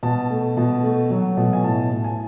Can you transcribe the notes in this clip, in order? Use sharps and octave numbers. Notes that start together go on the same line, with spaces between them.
B2 A5
A3
B2
A3
F#3
B2
G#5
A2 A5
A2
G#5